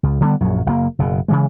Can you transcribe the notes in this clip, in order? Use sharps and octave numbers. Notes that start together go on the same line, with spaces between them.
C#2
D3 G3 A#3 B3
A#1 F#2 F#3
F#1 A#2 A#3
F#1 B2
C#3 E3 G#3